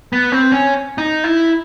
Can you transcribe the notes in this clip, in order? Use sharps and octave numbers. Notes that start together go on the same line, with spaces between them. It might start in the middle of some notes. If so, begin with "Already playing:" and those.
B3
C4
C#4
D#4
E4